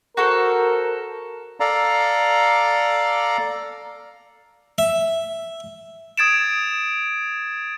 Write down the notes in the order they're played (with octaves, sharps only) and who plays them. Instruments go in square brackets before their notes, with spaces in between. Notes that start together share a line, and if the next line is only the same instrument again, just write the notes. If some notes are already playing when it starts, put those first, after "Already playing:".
[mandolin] F#4 A4 C5 [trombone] A#4
[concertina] A4 D5 F5 A#5
[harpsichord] E5
[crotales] D#6 G#6 A6 D7 E7